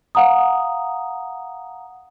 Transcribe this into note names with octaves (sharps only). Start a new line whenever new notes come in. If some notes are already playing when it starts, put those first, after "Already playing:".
F5 F#5 A#5 D#6